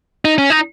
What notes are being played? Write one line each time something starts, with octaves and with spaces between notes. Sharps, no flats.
D#4
C#4
D#4